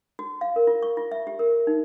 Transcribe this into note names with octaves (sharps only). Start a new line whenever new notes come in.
F#4
F5
A#4
F4
C#6
F4
E5
G4
A#4
D#4